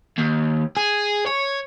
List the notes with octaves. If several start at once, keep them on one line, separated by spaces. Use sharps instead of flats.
D#2
G#4
C#5